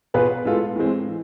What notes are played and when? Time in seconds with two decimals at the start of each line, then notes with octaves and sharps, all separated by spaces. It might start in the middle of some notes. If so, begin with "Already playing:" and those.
0.14 B2 B3 F4 G#4 B4
0.45 A2 G#3 B3 F4 A4
0.76 A2 E3 G#3 C4
1.07 E3